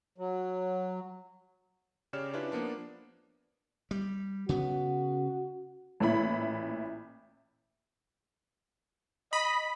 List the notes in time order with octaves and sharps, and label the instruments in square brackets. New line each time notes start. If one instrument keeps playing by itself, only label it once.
[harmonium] F#3
[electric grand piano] C#3 G4 C#5 D5 F6 E7
C#4 D4 E4 F4 G4 B4
F3 A#3 B3 D4 F4
[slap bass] G3
[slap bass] C#3 B3 [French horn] F#4
[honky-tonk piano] A1 A#2 E4 B5
[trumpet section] D#5 [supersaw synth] B5